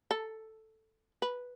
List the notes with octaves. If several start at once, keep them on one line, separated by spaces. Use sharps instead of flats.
A4
B4